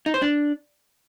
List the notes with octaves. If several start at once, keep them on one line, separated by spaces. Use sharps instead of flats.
D#4
C5
D4